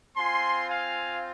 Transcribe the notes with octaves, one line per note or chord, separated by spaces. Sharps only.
C4 F4 G#5 C6
F5 G#5